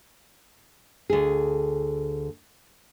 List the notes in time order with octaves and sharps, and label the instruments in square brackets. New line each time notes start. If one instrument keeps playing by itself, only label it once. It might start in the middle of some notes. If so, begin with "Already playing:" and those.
[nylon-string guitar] D2 G#4